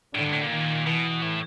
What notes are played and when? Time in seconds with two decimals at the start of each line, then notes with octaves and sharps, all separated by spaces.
0.15 A2 D3
0.24 G2
0.32 A2
0.42 A#2
0.50 D#3
0.86 B2 E3
1.22 A2